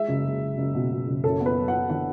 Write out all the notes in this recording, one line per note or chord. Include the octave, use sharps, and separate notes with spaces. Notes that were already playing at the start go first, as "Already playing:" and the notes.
Already playing: G#3 E5
F#1
G#3
F#1
F#1
B2
B2
F#1
F#2 A4
B3
B4
F#3
F#5
B3
D3 F#5